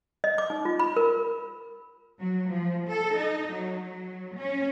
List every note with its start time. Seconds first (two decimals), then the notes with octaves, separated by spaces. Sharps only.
0.24 D#5
0.38 D6
0.50 D#4
0.65 F4
0.79 B5
0.97 A#4
2.19 F#3
2.49 F3
2.87 A4
3.18 D#4
3.51 F#3
3.84 F#3
4.37 C#4